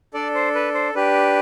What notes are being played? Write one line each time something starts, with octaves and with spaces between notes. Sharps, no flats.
D4 A4 D5
C5
B4
C5
D4 G4 B4